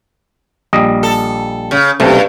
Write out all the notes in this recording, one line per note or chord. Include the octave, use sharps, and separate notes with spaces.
A#1 G3 D#5
A4
C#3
B1 G2 C3 A3